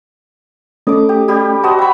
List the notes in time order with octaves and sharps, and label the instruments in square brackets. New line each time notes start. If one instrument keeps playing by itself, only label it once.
[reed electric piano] A3 C#4 A4 [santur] D#5 D6
[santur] G4
G3 G4
[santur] F#4 C5 D#5 [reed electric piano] A5
[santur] E5 B5 [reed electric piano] G5